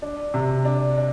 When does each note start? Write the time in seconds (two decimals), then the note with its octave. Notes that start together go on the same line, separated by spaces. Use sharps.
0.02 D4
0.34 C3
0.65 D4
0.98 D4